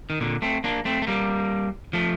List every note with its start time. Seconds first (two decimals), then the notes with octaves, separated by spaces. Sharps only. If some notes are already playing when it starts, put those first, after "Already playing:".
0.10 D#3
0.21 A#2 D3
0.42 A3 C4
0.64 A#3 D4
0.85 A3 C4
1.02 A3
1.07 G3 A#3
1.93 F3 A3